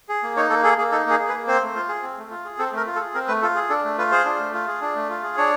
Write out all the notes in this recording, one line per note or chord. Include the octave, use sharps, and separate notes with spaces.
G#4
A#3
D#4 C#5
A#3 A4
G#4 A4
A#3 G#4
D#4 A4
A#3 G#4
G#4
B4
A#3
C4 C5
A3
F4
G#4
C4
A3
F4
G#4
C4 A4
A3 A#4
F4
A4
G#4
C4 A#4
A3 B4
F4 A4
G#4
D4 A4
A3
F4 B4
G#4 C5
D4
A3
F4
G#4
D4
A3
F4
G#4
D4 C#5